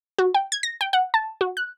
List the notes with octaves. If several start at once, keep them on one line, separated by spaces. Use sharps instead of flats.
F#4
G5
G#6
A#6
G5
F#5
A5
F#4
F#6